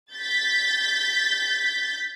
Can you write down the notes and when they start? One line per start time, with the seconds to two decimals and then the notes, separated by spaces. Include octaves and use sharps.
0.14 G6 A6 B6